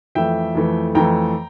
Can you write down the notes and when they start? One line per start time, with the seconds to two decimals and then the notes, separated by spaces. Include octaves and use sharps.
0.15 F2 E3 A3 E5 G5
0.55 F2 E3 A3
0.95 F2 E3 A3 G5 A#5